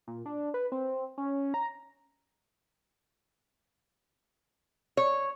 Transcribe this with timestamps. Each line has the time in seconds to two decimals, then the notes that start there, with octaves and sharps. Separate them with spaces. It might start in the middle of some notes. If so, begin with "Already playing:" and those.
0.07 A#2
0.26 D4
0.54 B4
0.72 C4
1.18 C#4
1.54 A#5
4.97 C#5